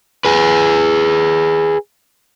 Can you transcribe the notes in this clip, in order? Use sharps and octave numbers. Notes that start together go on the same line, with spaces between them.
G#4 B4